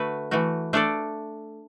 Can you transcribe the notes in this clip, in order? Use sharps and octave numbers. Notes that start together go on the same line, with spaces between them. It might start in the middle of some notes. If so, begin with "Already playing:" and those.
Already playing: D3 A3 F#4 B4
E3 A3 F#4
A3 D4 A4 D5